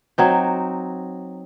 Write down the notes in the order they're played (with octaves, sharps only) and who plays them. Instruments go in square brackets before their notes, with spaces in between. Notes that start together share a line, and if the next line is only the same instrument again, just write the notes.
[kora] F#3 C4 D#4